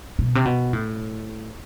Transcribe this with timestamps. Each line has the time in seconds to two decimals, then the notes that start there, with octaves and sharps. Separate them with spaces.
0.19 B2
0.35 C3
0.45 B2
0.73 A2